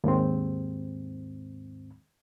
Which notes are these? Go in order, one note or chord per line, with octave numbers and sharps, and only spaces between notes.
D#2 G#2 C4